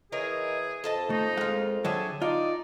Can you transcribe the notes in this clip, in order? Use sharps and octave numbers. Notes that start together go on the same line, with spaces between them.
E3 D#4 G#4 A#4 C#5
F2 A4 D#5 A5
A3 D#4
G#3 A#3 F4 F#5
D3 F#3 G#4 E5 G5 A5
D#4 F4 D5